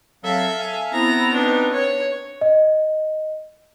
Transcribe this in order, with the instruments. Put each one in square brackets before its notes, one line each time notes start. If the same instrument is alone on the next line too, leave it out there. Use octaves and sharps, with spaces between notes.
[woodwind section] F#3 C4 F5 [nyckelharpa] A4 E5
[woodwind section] F5 G#5
[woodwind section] B3 C4 [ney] E4 [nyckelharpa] A#5
[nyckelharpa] D4 D#4 [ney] B4
[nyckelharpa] C#5
[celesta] D#5